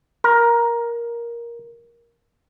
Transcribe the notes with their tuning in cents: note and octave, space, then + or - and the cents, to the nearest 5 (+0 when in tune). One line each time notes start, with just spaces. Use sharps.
A#4 +10